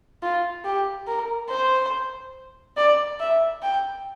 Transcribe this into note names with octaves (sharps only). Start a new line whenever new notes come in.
F4
G4
A#4
C5
D5
E5
G5